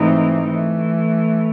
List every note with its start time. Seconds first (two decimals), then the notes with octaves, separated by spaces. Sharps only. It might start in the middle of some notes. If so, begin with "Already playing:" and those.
Already playing: G#2 E3 A3 C4 D#4
0.46 E3 A3